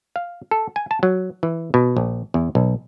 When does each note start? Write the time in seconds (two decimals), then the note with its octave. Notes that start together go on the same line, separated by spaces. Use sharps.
0.16 F5
0.51 A4
0.76 G#5
0.91 A5
1.03 F#3
1.43 E3
1.74 B2
1.97 A#1
2.34 E2
2.55 B1